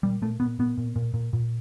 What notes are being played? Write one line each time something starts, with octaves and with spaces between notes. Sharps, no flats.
A#2 G3
A#2 A3
A#2 B3
A#2 B3
A#2
A#2
A#2
A#2